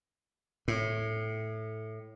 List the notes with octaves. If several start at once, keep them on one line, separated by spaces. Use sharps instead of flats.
A2